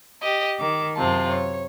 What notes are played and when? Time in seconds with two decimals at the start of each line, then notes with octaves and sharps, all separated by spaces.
0.21 G4 D#5
0.58 D#3 D6
0.95 F#2 C3 F4 A5
1.29 C#5